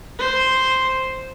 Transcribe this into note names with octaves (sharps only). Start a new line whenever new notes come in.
C5